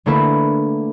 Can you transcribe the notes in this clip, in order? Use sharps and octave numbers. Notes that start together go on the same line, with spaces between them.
D3 A3 A#3 E4 B4